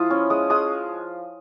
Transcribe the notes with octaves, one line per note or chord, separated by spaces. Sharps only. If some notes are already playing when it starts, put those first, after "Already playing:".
Already playing: F3 G#3 E4 F4 D#6
C#4
G#3 D#6
G#3 D#6